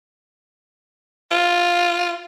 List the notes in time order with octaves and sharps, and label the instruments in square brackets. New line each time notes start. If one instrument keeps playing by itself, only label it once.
[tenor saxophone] F4